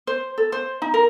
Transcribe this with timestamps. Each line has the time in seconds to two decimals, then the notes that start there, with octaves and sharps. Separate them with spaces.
0.07 C5
0.38 A4
0.52 C5
0.82 D#4
0.94 A#4